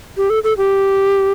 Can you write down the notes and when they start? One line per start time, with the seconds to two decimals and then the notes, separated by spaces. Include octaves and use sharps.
0.17 G4
0.30 A4
0.44 A4
0.57 G4